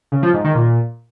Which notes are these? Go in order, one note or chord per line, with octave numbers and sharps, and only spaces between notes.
C#3
F3
G#2
D#3
A#2